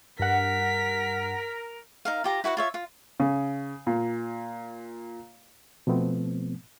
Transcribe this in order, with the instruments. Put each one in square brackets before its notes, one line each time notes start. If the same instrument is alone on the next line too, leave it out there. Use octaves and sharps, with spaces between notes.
[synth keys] G2 F#5 [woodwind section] A#4 [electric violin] B6
[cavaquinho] D#4 A#4 F5
F4 G4 A#5
E4 F#4 B4 F#5
F4 C#5 E5
F4
[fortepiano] C#3
A#2
[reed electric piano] B2 F3 A3 B3 C4